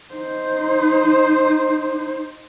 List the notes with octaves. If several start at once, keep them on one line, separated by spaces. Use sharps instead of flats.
D#4 C5